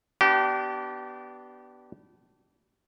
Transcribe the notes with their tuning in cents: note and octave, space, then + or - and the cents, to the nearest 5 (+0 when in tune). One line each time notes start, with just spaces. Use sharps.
B3 +5 D4 +0 G4 -30